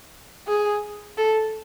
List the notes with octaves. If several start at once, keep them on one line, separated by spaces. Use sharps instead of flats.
G#4
A4